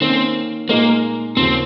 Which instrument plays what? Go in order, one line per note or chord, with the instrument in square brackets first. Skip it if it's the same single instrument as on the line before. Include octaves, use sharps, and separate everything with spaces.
[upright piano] D#3 A#3 C#4 [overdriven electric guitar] C4
[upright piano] A#2 G#3 D#4 A#4 D#5 [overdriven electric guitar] A#3
[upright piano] D#2 C#3 F3 [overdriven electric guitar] C4